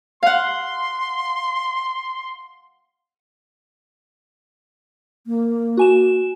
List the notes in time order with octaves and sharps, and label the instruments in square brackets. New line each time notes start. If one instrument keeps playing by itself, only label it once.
[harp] F5 F#5 [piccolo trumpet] C6
[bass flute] A#3
[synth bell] F#4 G#5 E7